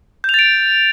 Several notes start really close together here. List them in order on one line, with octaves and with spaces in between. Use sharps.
G6 F7 A6 D7